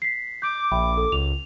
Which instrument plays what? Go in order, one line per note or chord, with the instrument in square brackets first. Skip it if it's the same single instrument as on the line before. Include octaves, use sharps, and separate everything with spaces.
[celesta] B6 C7
[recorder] D6 [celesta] G6
[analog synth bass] A#1 [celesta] E5 G5 B5
[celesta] A4
[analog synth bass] C#2 [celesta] F7